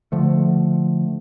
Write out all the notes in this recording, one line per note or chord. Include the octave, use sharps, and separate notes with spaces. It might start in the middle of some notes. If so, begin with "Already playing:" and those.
D3 F3 A3